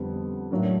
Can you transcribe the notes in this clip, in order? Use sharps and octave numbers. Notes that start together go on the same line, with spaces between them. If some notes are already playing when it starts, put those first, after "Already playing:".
Already playing: F2 D3 G3 B3
A2 F#3 A#3 D4